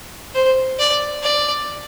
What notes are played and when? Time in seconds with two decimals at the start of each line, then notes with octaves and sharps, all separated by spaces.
0.35 C5
0.79 D5
1.23 D5